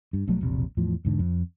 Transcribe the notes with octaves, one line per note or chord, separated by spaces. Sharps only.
G2
B1 F3 F#3 A3
E1 A#1 C3
E2 A2 F3
E1 G#2 D3
F2